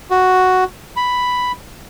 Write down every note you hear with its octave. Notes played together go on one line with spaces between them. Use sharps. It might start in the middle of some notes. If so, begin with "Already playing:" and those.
F#4
B5